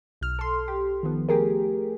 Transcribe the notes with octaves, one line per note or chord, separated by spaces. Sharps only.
B1 F6
A4 C6
G4
D#3 F3 B3
A3 G4 G#4 A#4